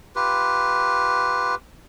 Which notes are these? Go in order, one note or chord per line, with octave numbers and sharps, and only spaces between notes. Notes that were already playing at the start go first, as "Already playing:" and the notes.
F4 G4 B4